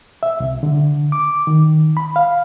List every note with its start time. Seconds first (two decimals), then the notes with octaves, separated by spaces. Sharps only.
0.23 E5
0.40 C2
0.63 D3
1.12 D6
1.47 D#3
1.97 B5
2.16 F5